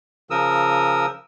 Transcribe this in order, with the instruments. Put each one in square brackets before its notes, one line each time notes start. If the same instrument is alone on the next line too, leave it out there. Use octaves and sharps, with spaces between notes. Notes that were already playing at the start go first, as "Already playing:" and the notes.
[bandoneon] C#3 F3 A#4 D#6 E6